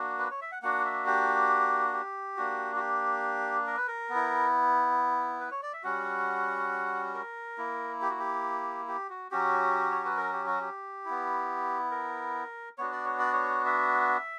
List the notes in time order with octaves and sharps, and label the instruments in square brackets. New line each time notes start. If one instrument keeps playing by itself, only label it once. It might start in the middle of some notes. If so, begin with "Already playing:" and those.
Already playing: [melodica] A#3 D4 F#4
B4
C#5
E5
F#5
A#3 D4 F#4 F#5
E5
G4
G4
A#3 D4 F#4
F#4
G4
A#4
B4
A#4
B3
E4
B4
C#5
D5
E5
G3 C#4 F#4 F#5
A#4
A#3 E4
G4
F#4
G4
G4
F#4
F#3 C#4 F#4 G4
C#5
B4
A#4
G4
F#4
G4
B3 E4
A#4
B3 D4 F#4 C#5
D5
C#5
D5
C#5
E5